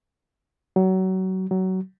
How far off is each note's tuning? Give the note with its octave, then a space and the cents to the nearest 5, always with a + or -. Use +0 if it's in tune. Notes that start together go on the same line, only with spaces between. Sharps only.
F#3 +25
F#3 +20